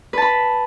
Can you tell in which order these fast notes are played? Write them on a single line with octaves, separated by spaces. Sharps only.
B4 A5 B5